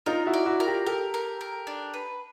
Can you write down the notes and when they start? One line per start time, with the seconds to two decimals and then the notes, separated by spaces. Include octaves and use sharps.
0.06 D#4 F4 A#4
0.27 E4 F#4
0.34 D5
0.46 E4 F#4
0.60 A#4
0.67 F4 G4
0.86 G4 A4 A#4
1.14 A#4
1.41 A#4
1.67 D4
1.94 B4